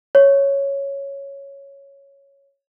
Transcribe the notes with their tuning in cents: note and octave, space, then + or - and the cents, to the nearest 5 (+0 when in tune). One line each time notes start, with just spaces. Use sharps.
C#5 +0